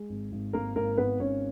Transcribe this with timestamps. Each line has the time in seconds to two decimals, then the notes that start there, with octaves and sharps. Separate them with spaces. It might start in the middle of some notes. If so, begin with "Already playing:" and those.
Already playing: G#3 G#4
0.10 G#1
0.32 G#1
0.53 G#1 A#3 A#4
0.76 G#1 A#3 A#4
0.98 G#1 B3 B4
1.20 G#1 C#4 C#5